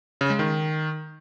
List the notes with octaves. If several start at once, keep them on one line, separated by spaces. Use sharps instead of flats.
C#3
G#3
D#3